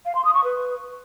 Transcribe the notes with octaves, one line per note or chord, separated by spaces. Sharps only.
F5
C6
D#6
C#6
B4